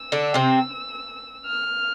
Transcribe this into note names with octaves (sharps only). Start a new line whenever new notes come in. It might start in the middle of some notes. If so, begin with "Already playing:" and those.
Already playing: E6
D3 D4
C3 C4
F6